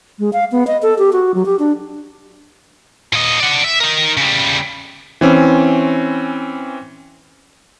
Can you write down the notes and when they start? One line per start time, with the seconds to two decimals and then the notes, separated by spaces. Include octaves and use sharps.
0.19 G#3
0.33 F5
0.52 B3
0.67 D#5
0.82 A4
0.99 G4
1.13 F#4
1.34 F#3
1.46 G4
1.59 D4
3.13 A#2 D#5
3.40 D5 F#5
3.64 E5
3.80 D#4 A#4
4.17 C#3 G3
5.21 E3 C4 C#4